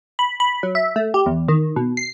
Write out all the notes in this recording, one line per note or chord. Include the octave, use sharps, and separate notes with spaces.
B5
B5
F#3
E5
A3
G4
E2
D#3
B2
C7